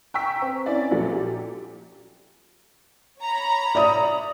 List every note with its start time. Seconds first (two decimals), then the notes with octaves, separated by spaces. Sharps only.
0.14 G5 A#5 C#6 E6 B6
0.42 C4
0.66 C#4 E4 D5
0.91 A#1 F3 F#3 A4
1.11 G4
3.20 C#5 A#5 B5
3.75 D5 E5 D#6